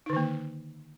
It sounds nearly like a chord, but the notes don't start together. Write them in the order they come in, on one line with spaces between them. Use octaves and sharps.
D#4 D3 D#3 A#3